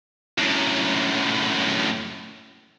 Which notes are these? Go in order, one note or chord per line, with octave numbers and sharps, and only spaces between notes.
F#2 A2